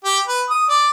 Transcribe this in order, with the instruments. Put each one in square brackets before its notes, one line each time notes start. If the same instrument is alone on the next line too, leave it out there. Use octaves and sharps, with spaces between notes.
[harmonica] G4
B4
D#6
D5